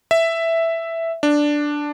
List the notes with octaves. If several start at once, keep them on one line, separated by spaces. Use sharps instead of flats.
E5
D4